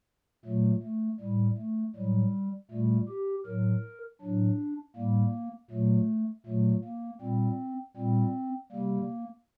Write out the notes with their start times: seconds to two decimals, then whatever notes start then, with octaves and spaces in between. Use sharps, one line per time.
0.45 A#2 F#3 A3
0.83 A3
1.20 A2 G3
1.57 A3
1.95 A2 F#3 G3
2.71 A#2 G3 A3
3.09 G4
3.46 A2 F#3 A#4
4.21 A2 F#3 D4
4.96 A2 G3 A#3
5.71 A#2 F#3 A3
6.46 A#2 F#3 A3
6.84 A#3
7.21 A#2 G3 C4
7.97 A#2 G3 C4
8.72 C3 G3 A#3